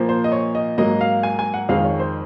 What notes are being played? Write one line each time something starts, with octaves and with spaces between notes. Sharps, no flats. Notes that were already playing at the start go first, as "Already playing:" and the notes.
Already playing: A#2 F3 A#3
C5
D#5
C#5
D#5
G#2 F#3 A#3 D#5
F5
G#5
G#5
F#5
F2 D#3 G#3 F5
C#5
C5